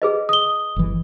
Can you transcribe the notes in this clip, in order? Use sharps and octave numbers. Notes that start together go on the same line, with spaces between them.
G#4 B4 D#5
D#6 G7
G1 E3